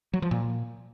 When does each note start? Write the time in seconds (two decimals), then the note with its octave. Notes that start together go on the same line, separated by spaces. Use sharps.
0.14 F#3
0.22 F3
0.31 A#2